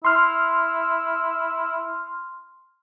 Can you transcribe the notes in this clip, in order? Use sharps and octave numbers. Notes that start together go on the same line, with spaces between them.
E4 C6 F6